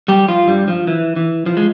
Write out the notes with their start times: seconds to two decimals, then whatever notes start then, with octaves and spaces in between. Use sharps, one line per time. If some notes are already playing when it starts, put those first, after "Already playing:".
0.08 G3 G4
0.28 F3 F4
0.48 G2 G3
0.68 F3
0.87 E3
1.16 E3
1.46 F3
1.57 G#3